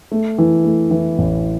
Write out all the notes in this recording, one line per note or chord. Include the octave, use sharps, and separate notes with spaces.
A3
E3
A3
E3
A1